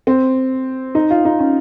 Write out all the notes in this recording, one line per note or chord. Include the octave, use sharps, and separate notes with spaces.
C4
D#4
F4
D#4
C#4